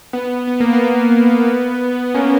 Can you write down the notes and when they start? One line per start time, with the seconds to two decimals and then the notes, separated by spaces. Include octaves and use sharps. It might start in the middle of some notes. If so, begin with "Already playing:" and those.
0.13 B3
0.47 B3
0.60 A#3
0.73 B3
2.14 A#3 C#4